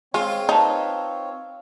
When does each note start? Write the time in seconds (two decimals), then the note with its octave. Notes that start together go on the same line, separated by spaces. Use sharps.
0.14 G#3 C4 F4 C#5
0.49 D#4 B4 A5